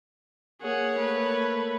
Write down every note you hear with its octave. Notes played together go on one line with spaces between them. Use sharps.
A#3 G#4 C#5 F#5
A3 B4